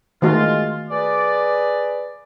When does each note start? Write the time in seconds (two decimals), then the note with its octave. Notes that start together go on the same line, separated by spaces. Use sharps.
0.22 D#3 G#3 A3 F4 F#4
0.89 G#4 B4 D5